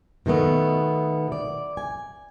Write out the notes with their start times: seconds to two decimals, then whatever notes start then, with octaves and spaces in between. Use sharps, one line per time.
0.26 B2 D#3 A3 B3
1.32 D5
1.77 G#5